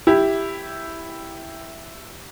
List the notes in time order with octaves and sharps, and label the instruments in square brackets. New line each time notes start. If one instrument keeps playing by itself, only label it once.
[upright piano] E4 G4